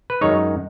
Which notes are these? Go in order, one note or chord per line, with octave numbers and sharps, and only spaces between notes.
B4
F#2 D#3 G#3 D#4 C#5